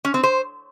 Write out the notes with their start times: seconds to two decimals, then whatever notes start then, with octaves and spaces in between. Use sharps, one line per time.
0.05 C#4
0.14 C4
0.23 C5